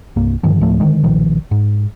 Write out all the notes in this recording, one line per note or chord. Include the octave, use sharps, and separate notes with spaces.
C2 G2 A#3
G2 D3 D#3 F3
D2 A2 F3 A3
D3 D#3 G#3
B1 A#2 D#3 F3
G#2